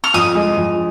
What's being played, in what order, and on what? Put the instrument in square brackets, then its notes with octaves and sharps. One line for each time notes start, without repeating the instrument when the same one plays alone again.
[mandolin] F6
[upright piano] F2 [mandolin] D#6
[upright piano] G#3
F2